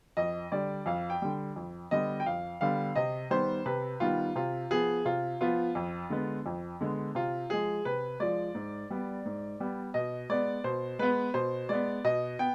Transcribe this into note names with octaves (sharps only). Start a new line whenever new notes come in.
F2 D#5
D3 G3 D5
F2 F5
G5
D3 G3
F2
D3 G3 B3 D#5
G5
F2 F5
D3 G3 B3 F5
C3 D#5
D#3 G3 B3 C5
C3 B4
D#3 G3 B3 F4
C3 F4
F3 B3 G#4
C3 F4
F3 B3 F4
F2
D3 G#3 B3
F2
D3 G#3 B3
C3 F4
F3 G#3 G#4
C3 B4
F3 G#3 D5
G#2
G3 B3
G#2
G3 B3
B2 D#5
G#3 B3 D5
B2 C5
G#3 B3 B4
B2 C5
G#3 B3 D5
B2 D#5
B3 G5